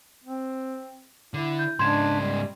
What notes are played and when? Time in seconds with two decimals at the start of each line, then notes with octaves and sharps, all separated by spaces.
0.24 C4
1.34 D3 E4
1.59 G6
1.79 G#2 C#3 D4 C6 G#6 E7
2.20 G3